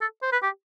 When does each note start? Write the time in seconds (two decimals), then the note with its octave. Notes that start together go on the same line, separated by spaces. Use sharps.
0.01 A4
0.22 C5
0.32 B4
0.43 G4